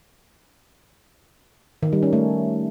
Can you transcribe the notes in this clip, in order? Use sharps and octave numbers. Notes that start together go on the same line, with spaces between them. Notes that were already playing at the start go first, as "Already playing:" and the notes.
D#3
G3
C#4
A3